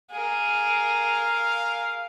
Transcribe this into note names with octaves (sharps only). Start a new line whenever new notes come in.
G#4 A#4 F5